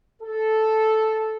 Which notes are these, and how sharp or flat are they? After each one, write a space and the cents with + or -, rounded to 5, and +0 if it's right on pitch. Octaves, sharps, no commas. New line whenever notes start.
A4 -5